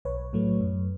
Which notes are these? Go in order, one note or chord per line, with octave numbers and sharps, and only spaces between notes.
B1 B4 C#5
A2 F#3 A3
F#2